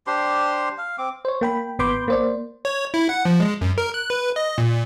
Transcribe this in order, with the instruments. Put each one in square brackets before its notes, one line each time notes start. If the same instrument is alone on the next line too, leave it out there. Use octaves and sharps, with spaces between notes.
[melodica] D4 G4 C5 C6
F5
C4 D6
[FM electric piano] C5 C#5
A#3 G5 B5
G#1 B3 B5 C6 D6 G6
A#3 C5 D5
[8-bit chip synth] C#5
E4
F#5
F3
G#3
F#2
A#4
F#6
B4
D#5
A#2